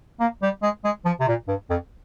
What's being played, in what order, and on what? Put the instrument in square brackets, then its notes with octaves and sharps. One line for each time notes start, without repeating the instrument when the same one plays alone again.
[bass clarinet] A#3
G3
G#3
G#3
F3
C3
A#2
G2
F2